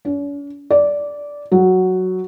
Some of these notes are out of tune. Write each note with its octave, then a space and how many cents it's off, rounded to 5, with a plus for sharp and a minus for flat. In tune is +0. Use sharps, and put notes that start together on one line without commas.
C#4 +45
D5 -10
F#3 +0